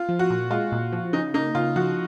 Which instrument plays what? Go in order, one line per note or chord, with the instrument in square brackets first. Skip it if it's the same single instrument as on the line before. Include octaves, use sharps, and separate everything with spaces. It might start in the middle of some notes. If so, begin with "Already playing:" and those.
Already playing: [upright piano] F4
[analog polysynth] F3
[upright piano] F#4
[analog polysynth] A#2
[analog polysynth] G#3 [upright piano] F4
[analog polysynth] A#2
F3
[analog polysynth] C#3 [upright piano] D#4
[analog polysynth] A#3 [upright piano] D#4
[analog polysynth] C#3 [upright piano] F4
[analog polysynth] F3 [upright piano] F#4